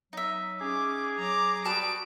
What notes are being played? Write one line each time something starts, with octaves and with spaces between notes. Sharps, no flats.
F#3 D#4 E5
C#4 G#4 D6
F#3 A#5 D6
G3 F#4 B4 A5 D#6 D7